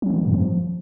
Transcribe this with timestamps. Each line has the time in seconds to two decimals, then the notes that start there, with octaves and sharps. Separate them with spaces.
0.02 F#3
0.10 E3
0.18 D#3
0.26 G2
0.34 F3